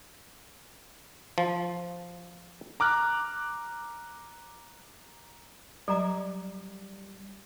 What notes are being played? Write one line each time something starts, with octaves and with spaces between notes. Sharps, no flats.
F3
A#5 D6 F6 F#6
F#3 G3 D5 A#5 D6